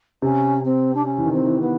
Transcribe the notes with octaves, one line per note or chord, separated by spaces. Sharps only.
C3 C#4
C4
D4
C#4
E3
D#3
C4
E3
B3